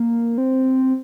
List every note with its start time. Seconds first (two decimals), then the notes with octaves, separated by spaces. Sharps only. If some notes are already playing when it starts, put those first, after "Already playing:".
Already playing: A#3
0.38 C4